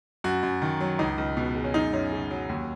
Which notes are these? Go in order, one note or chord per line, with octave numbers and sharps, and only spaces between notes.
F#2 F#4
F#2
D#3
F#3
C#2 D#4
C#2
B2
G#3
C#4
F#2 D#4
F#2 C#4
C#3
F#3
D#2